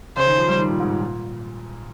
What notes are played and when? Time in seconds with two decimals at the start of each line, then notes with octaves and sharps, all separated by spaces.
0.17 C#3 C5
0.27 D#3
0.38 F3
0.49 G3
0.58 D#3
0.69 A#2
0.80 G#2
0.91 A#2
1.01 A#2